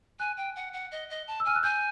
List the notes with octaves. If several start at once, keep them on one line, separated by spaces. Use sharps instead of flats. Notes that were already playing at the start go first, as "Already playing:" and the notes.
G#5 F#6
G5
F#5
F#5
D#5
D#5
A5
E6
G#5 F6
F#6
G#5 G6